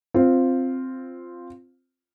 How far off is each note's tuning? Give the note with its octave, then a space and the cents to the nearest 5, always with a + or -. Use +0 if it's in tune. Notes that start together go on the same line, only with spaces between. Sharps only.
C4 +0 F4 +0